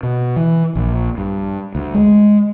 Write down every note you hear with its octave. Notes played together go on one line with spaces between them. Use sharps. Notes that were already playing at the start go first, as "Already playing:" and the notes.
B2
E3
A#1
G2
D2
G#3